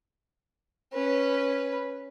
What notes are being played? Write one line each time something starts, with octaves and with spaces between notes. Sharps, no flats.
C#4 B4